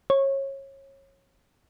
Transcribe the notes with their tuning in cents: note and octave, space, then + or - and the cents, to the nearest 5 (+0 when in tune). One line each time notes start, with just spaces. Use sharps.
C#5 -25